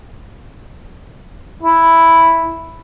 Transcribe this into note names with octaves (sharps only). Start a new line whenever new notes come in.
E4